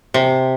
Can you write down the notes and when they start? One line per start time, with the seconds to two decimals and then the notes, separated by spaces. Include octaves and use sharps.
0.14 C3